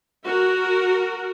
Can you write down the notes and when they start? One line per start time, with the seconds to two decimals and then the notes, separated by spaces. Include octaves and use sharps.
0.24 F#4 A#4